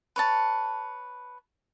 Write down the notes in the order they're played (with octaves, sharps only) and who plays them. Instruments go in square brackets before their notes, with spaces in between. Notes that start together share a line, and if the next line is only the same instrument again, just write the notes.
[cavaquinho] B4 C#5 A5